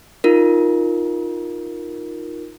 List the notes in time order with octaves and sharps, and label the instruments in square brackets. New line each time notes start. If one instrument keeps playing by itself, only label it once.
[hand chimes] D#4 F4 A#4